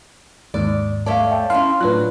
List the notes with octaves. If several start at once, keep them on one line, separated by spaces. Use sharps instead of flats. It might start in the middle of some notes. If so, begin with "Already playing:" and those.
D#2 G#2 D5
A3 C#5 D5 F5 A5
E5 G5 A5
C#4 D4 E4 F5 C6
A2 F#3 D4 F4 B4 F#6